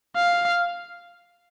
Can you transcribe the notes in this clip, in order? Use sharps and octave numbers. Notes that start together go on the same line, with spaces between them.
F5